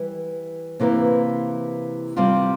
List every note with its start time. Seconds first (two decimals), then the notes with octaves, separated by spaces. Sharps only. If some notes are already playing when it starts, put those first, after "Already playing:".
Already playing: E3 G3
0.80 C3 E3 A#3 E4
2.17 C3 G3 C4 F4